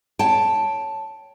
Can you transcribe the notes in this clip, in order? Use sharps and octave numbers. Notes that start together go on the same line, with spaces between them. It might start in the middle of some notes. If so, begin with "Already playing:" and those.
C#5 G5 A5